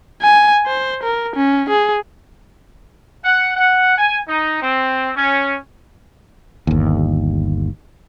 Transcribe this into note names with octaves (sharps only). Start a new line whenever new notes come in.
G#5
C5
A#4
C#4
G#4
F#5
F#5
G#5
D#4
C4
C#4
G1 D#2